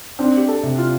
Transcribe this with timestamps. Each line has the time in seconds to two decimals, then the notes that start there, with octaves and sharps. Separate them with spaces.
0.19 C4 D4
0.37 G4
0.48 A4
0.63 C3
0.78 F4